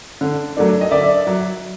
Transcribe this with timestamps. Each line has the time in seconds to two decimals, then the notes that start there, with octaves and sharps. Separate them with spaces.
0.21 D3
0.57 F#3 A3 D4
0.81 D#5
0.91 D3 D5 E5
1.27 F#3